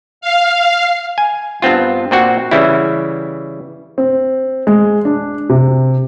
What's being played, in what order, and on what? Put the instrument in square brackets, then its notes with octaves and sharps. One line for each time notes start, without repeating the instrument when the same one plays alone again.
[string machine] F5
[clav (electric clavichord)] G#5
G2 B3 C4 F4
A#2 C4 F#4 F#5
C#3 E3 G3 E4
[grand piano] C4
G#3
D4
C3